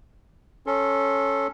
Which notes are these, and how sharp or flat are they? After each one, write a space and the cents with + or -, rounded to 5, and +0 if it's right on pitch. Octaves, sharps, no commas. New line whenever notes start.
C#4 +0 A4 +0 C6 +20